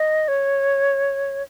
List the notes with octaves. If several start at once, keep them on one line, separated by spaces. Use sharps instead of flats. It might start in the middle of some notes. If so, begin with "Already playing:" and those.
Already playing: D#5
C#5